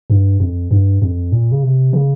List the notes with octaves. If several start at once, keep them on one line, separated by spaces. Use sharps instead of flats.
G2
F2
G2
F2
A#2
C#3
C3
C#3